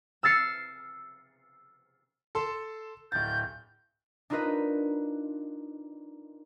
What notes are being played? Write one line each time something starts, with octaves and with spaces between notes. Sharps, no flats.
E6 F6 A6 C7 C#7
A4 A5 C6
D1 G6 A6
D4 D#4 F4 A#4 B4 D#5